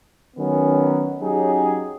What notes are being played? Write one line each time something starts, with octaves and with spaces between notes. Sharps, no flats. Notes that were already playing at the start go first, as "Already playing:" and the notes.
D#3 F#3 B3 C#4
F#3 C#4 D#4 G4 G#4